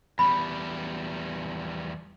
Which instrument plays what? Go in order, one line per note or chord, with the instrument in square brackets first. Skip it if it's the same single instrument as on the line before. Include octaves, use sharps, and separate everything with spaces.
[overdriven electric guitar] E2 G3 [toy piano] B5